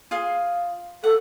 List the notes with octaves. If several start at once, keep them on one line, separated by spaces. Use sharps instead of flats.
F4 G#4 F5
A4 F#5